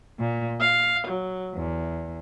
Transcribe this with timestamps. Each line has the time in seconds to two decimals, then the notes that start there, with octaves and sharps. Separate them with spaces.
0.20 A#2
0.60 F5
1.07 F#3
1.55 E2